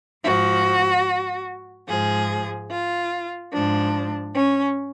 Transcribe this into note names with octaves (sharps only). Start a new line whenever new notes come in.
G#2 F3 F#4
G#2 F3 G#4
F4
G#2 F3 D4
C#4